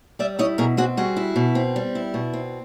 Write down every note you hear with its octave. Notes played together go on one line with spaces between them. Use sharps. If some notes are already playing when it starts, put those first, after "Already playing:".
G3 D5 E5
E4 C#5 D#5
B2 G#4 A#4
C4 F#4 G#4
G3 F#4 G#4
E4
B2
C4
G3
E4
B2
C4